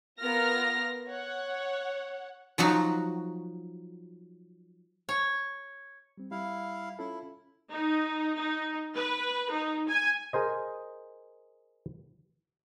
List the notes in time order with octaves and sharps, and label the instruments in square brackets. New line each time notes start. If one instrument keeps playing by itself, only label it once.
[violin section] B3 F4 A#4 F6 A#6
C#5 F#5
[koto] F3 F#3 D#4 F#4
C#5
[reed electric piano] G3 C4
[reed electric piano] G3 [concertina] E4 F5
[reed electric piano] C#4 F4 A4 [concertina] E4
[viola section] D#4
D#4
B4
D#4
G#5
[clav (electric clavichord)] G#4 A#4 C5 D#5